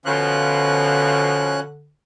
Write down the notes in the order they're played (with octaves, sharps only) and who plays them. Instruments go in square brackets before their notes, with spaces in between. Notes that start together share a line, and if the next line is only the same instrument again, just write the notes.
[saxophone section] B2 F3 [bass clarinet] D3 [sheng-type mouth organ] C#4 F#6